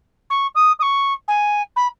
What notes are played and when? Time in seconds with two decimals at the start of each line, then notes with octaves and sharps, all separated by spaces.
0.30 C#6
0.55 D#6
0.79 D#6
0.82 C#6
1.28 G#5
1.76 B5